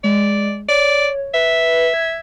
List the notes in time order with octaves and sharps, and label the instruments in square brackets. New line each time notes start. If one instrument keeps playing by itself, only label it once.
[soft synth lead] G#3 [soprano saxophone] D5
[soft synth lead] C#5 [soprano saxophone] D5
[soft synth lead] B4 [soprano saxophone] E5
[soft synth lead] G#6